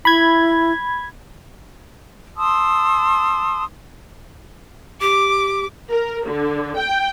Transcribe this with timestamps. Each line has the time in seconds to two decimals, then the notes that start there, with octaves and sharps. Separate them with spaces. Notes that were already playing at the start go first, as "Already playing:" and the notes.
0.05 E4 B5 G#6
2.37 A5 C6 D#6 E6
5.01 G4 D6
5.91 A#4
6.27 D3
6.77 G5